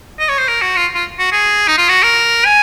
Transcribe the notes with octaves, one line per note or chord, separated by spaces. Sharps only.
D#5
C#5
C5
A#4
F#4
F4
F4
F#4
G#4
D#4
F4
F#4
A#4
G#5